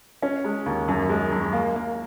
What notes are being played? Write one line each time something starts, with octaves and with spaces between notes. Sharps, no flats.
C#4
G#3
D#2
F#2
G#3
F#2
A#3
A#3